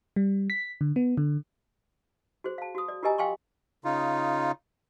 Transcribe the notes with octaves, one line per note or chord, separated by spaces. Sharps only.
G3
B6
D3
B3
D3
F#4 G#4 C5
F5 A5
F#4 D#6
D5
F4 G4 A#4 D#5 G#5 A#5
F5 G5 G#5 C6 C#6
C#3 D#4 F4